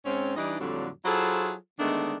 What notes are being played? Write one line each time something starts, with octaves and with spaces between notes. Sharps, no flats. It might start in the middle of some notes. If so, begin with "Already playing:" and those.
G#2 C4 C#4
E3 G3 D4 D#4
F2 A2 D3 F#3 G3 D4
F#3 E4 F4 G#4 A4 C5
D3 D#3 G#3 A3 B3 D4